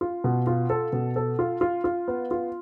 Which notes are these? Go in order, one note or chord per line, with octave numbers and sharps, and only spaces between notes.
F4
B2
F4
A4
B2
A4
F4
F4
F4
B3
F4